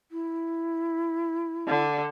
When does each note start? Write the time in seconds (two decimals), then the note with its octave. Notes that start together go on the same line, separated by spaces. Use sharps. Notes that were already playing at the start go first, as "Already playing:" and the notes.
0.11 E4
1.68 D3